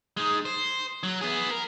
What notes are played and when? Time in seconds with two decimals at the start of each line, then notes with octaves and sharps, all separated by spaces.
0.17 G#3 D#4
0.45 C5
1.03 F#3
1.21 B3 G#4
1.51 A#4